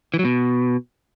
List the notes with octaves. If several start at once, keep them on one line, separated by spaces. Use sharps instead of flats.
E3
F#3
B2